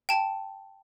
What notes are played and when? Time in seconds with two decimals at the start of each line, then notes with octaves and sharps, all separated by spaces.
0.09 G5 A5